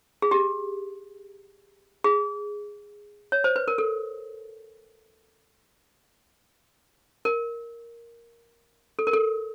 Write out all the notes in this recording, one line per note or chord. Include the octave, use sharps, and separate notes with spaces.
G#4
G4
G#4
C#5
C5
B4
A#4
A4
A#4
A4
A#4
A4